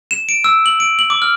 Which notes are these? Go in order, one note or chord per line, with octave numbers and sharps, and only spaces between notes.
E7
D7
E6
F#7
D7
F#7
D6
F6